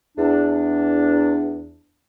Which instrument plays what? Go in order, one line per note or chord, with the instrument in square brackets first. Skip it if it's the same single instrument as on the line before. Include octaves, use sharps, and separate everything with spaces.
[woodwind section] E2 D4